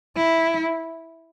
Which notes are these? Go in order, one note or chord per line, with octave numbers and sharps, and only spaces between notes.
E4